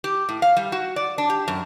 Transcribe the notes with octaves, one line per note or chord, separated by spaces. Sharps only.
G4
A2
F5
G3
F#4
D5
D4
G4
F#2